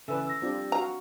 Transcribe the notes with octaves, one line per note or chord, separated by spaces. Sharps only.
C#3 E3 A4 B4 D5 E5 G#5 E6
E6 A#6
G3 C4 D4 F4
F#4 F5 A#5